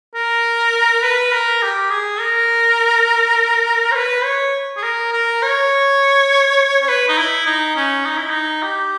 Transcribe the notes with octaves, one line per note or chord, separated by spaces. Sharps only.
A#4
B4
A#4
G4
G#4
A#4
C#5
B4
C#5
G#4
A#4
A#4
C#5
C#5
B4
D#4
E4
D#4
C#4
D#4
E4
D#4
G4